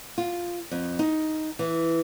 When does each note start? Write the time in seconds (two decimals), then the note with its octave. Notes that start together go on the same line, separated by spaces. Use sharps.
0.18 F4
0.71 F2
0.99 D#4
1.59 E3